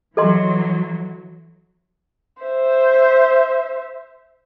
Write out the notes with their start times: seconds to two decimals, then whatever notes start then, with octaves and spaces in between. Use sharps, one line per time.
0.17 E3 F#3 A4 D#5 C6
2.43 C5 E5